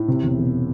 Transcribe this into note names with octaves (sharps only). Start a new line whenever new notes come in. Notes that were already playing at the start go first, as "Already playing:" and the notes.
Already playing: A2
C3
E1
E1